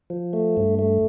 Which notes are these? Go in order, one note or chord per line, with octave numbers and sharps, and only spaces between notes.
F3
A3
G2
A3